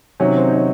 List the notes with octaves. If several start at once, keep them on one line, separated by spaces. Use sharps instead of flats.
C3 D#3 F#3 C#4
C4
D#4
C#4